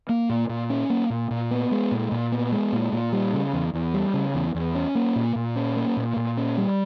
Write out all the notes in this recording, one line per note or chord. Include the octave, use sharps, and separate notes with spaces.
A#3
A#2
A#2
C#4
A#3
A#2
A#2
B3
G#3
A#2
A#2
B3
G#3
A#2
A#2
G3
C#3
E2
E2
G3
C#3
E2
E2
C#4
A#3
A#2
A#2
C#4
A#3
A#2
A#2
C#4
G3